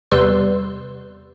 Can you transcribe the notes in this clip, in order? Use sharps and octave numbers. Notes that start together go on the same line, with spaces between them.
E2 C3 G3 B4 C6 E6